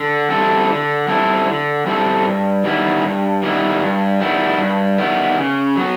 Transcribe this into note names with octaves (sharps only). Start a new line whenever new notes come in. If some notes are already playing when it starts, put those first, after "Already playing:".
Already playing: D3
G3 C4 E4 A4
D3
G3 C4 E4 A4
D3
G3 C4 E4 A4
G2
D#3 G3 B3 E4
G2
D#3 G3 B3 E4
G2
D#3 G3 B3 E4
G2
D#3 G3 B3 E4
C#3
F#3 B3